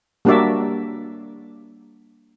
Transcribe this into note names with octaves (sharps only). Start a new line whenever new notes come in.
G3 A#3 D4 F#4 D5 E5